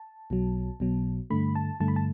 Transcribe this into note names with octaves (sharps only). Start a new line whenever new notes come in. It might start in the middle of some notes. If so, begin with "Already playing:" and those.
Already playing: A5
B1 B2 F#3
B1 B2 F#3
G2 D3 A3 B5
A5
G2 D3 A3 A5
B5
A5